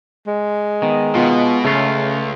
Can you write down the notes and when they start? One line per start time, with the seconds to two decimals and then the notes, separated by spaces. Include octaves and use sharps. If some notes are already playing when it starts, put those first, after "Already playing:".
0.27 G#3
0.82 D#3 B3
1.15 B2 B3 F4
1.64 C#2 C#3 A3 F4